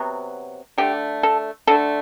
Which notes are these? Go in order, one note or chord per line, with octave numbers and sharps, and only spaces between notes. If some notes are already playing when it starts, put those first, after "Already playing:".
Already playing: C3 F#3 B3
D3 A3 G4
A4
D3 A3 A4